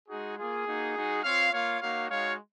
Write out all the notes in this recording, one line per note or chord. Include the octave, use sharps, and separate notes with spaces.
G#3 D#4 F#4 G#4
A#3 F4 G#4
A#3 D#4 F#4
G#3 D#4 F#4
C4 F4 C#5 F5
A#3 F4 C#5 F5
A#3 D#4 F#4 C#5 F5
G#3 D#4 F#4 C#5 F5